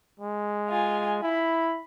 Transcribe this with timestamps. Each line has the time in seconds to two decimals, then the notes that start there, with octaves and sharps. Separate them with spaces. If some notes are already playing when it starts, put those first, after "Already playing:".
0.20 G#3
0.69 F4 G#5
1.22 E4 B5